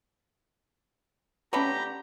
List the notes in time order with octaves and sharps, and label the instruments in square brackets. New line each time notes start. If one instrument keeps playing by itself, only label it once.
[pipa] D3 A3 B5 [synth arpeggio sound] C#4 B4 [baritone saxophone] G4 [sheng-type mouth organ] A#5